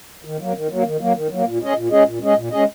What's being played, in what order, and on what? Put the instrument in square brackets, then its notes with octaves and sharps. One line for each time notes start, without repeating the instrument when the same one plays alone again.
[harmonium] D#3
F#3 A#3
D#3
F#3 A#3
D#3
F#3 A#3
D#3
F#3 A#3
A#2
G#3 C#4 G#4 D#5
A#2
G#3 C#4 G#4 D#5
A#2
G#3 C#4 G#4 D#5
A#2
G#3 C#4 G#4 D#5